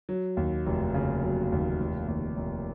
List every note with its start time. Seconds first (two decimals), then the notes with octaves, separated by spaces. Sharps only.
0.09 F#3
0.37 D#2
0.66 F1
0.94 C#3
1.24 F#3
1.52 D#2
1.81 F1
2.08 D#2
2.36 F1